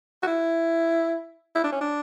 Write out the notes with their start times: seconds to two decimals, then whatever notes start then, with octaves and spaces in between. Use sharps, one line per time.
0.23 F#4
0.27 E4
1.56 E4
1.64 D4
1.72 C#4
1.81 D4